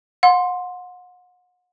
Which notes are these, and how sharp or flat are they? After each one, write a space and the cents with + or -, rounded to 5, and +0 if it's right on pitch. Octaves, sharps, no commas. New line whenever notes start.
F#5 -40 C6 +0